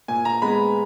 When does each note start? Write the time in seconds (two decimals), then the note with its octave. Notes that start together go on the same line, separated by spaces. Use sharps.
0.08 A#2 G#5
0.25 A#5
0.42 G#3 B3 B5